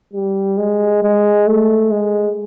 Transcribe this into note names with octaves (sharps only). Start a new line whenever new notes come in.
G3
G#3
G#3
A3
G#3